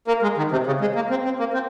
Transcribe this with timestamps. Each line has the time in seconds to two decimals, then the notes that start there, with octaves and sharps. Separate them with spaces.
0.08 A#3
0.22 G#3
0.37 D#3
0.52 C3
0.66 C#3
0.81 G#3
0.95 A#3
1.10 C4
1.25 C4
1.39 A#3
1.54 C4